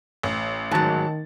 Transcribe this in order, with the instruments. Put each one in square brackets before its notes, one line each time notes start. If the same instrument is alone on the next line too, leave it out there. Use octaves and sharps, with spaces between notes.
[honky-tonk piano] A1
[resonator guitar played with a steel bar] G#2 F#3 [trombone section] D#3 [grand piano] A5 A6